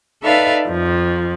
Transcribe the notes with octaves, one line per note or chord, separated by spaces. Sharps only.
D#4 A4 B4 D5 E5 F5
F2 F3